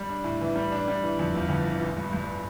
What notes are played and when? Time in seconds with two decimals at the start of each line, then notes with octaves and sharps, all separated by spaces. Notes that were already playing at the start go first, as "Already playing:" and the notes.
Already playing: G3
0.09 D4
0.24 A2
0.41 E3
0.56 G3
0.72 D4
0.88 G3
1.03 E3
1.19 F2
1.34 G1
1.49 F2
1.65 E3
1.82 A1
1.97 G2
2.13 G2